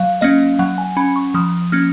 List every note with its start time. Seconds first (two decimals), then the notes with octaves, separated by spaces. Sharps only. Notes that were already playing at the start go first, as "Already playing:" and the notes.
Already playing: F#3 F5
0.21 A#3 C#4 D#5
0.59 F#3 F#5
0.78 G#5
0.97 C#4 B5
1.16 C#6
1.34 F3 D#6
1.72 A#3 C#4 F6